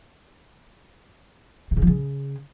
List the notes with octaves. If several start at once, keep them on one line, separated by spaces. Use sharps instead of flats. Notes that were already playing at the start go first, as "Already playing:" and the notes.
C3
C#3
F3
C#3